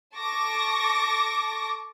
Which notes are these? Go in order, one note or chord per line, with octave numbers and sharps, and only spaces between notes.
A4 A5 C#6 D6 A#6